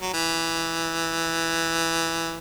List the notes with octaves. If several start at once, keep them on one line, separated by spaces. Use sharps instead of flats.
F#3
E3